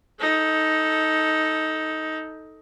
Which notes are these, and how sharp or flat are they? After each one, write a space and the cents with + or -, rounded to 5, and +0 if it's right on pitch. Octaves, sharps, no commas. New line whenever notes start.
D#4 +15 A4 +0